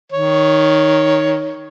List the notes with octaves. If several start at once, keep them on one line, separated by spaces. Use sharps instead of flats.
D#3 C#5